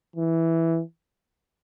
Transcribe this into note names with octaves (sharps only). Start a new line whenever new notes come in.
E3